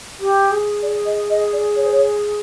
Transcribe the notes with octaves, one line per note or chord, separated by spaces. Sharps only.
G4
G#4
D5
D#5
D#5
D5
C#5
C5
C#5